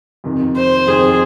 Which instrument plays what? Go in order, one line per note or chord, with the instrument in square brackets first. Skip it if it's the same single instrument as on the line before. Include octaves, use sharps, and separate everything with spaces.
[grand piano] F2 C3 D#3
[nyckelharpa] C5
[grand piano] F2 C3 D#3 [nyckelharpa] G#4